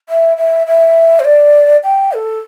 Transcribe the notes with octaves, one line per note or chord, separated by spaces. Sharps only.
E5
E5
E5
C5
D5
G5
A4